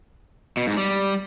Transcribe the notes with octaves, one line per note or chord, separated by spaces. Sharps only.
B2
G#2
G3